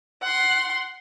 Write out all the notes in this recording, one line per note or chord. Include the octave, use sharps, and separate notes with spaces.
F#5 C6